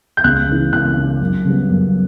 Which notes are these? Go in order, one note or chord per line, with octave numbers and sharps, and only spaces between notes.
G6
C#2 F#6
C#3 E3
C#2 F#6
C#3 E3
F#2
C#3 G3 B3
F#2